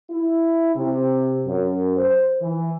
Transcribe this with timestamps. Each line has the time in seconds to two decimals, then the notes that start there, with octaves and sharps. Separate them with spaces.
0.10 E4
0.75 C3
1.46 F#2
1.97 C5
2.41 E3